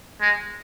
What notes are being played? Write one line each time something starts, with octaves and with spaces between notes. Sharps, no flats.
G#3